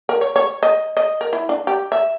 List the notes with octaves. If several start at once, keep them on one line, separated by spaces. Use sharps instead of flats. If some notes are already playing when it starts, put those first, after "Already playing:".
A#4
C#5
C#5
D#5
D#5
A#4
E4
D4
G4
E5